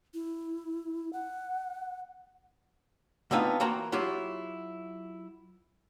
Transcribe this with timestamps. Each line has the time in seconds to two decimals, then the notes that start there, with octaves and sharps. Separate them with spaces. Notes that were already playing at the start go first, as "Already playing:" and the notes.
0.14 E4
1.13 F#5
3.31 D3 A3 B3 C4 D#4 F4
3.60 E3 A#3 F#4 G5 A#5 C6
3.92 F#3 E4 F4 G4